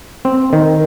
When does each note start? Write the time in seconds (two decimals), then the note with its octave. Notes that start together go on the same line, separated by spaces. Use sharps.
0.25 C4
0.53 D#3